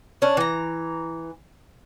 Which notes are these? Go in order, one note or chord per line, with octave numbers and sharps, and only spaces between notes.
C#4 D4
E3 A#5